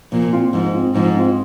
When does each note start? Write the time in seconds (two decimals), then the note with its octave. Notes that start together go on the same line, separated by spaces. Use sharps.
0.12 A#2 F3
0.33 C4 F4
0.53 G#2 F3
0.74 C4 F4
0.95 G#2 F3
1.16 C4 F4